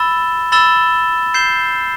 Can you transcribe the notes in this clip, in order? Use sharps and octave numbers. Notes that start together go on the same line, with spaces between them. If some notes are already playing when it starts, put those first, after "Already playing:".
Already playing: B5 E6 A6 E7 G7
B5 E6 A6 E7 G7
G6 C7 E7 G7